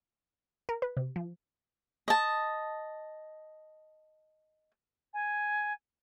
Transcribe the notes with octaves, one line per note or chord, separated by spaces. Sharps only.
A#4
B4
C3
F3
D#5 A5
G#5